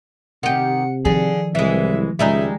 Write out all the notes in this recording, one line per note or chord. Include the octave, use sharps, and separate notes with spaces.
C3 D#3 G4 F#5
D3 D#3 F3 G#4
C2 E3 G#3 E5
C#2 G3 G#3 D#4 E5